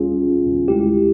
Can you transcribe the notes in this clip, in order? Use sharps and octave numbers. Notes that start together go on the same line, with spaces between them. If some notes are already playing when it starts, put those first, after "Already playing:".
Already playing: G3 C#4 F4 G#4
G#3 E4 G4